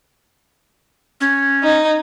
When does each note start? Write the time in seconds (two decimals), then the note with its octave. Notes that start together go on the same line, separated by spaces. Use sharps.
1.21 C#4
1.63 D#4